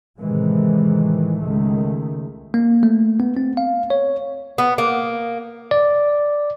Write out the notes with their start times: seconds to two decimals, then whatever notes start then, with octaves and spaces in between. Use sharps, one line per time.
0.20 A2 C3 D#3 E3 G#3
1.42 C#2 D#3 G#3 A3
2.54 A#3
2.83 A3
3.20 B3
3.37 C4
3.57 F5
3.90 C#5
4.58 B3
4.78 A#3
5.71 D5